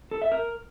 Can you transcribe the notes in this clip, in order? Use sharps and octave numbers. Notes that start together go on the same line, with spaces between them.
A4
E5
A#4